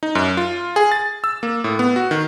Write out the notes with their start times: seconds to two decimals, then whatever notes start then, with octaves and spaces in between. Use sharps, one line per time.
0.03 D#4
0.15 F#2
0.37 F4
0.76 G#4
0.92 A6
1.24 E6
1.43 A#3
1.64 A2
1.79 B3
1.96 F#4
2.11 D#3